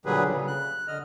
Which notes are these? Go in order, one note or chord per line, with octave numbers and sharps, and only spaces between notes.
A#2 D3 F#3 G3 G#4 B4
C#3
F#6
D3 D#5 F6